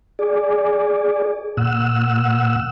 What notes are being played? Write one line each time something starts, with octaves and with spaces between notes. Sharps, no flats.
G#4 D5
A#2 F#5 E6